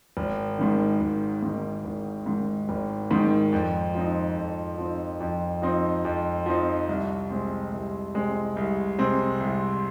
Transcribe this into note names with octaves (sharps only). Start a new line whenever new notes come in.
G#1
G#2 D#3
G#1
G#2 D#3
G#1
G#2 D#3
G#1
G#2 D#3
F2
F3 C4 D#4
F2
F3 C4 D#4
F2
F3 C4 D#4
F2
F3 C4 D#4
C2
C3 G#3 C4
C2
C3 G#3 C4
C2
C3 G#3 C4
C2